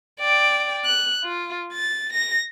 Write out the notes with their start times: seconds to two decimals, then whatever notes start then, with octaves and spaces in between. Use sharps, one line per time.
0.20 D5 G5
0.85 F#6
1.24 F4
1.73 A6
2.13 A#6